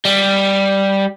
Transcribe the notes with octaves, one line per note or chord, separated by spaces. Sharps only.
G3